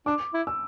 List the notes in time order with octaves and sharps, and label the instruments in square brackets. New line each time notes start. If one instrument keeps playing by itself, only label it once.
[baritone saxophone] D4 [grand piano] D6
[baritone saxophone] E4
[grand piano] E6